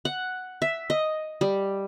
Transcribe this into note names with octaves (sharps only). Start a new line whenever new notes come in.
F#5
E5
D#5
G3